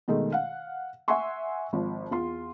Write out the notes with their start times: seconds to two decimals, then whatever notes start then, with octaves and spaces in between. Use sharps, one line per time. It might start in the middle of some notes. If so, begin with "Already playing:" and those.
0.08 B2 D#3 G#3 A3
0.32 F5 F#5
1.08 E5 F#5 G#5 C6 C#6
1.73 G#1 F3
2.11 E2 F4 C6